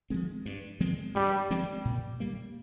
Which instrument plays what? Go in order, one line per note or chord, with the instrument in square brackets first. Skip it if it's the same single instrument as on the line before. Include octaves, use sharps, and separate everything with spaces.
[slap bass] F3 G#3 C4
G2
F3 G#3 C4
[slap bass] G2 [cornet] G3
[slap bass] F3 G#3 C4
A#2
G3 A#3